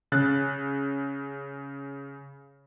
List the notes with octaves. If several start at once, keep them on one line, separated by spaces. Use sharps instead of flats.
C#3 F#6 A6